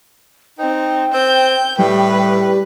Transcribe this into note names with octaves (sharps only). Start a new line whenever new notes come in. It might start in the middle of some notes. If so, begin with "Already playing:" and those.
C4 D#4 G5
C4 G6
A2 G3 B4